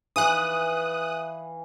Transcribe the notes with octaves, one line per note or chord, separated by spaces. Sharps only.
E3 F5 D#6 F#6